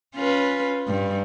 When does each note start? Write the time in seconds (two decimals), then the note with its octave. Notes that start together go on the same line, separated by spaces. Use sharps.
0.15 C#4 F4 B4
0.88 G2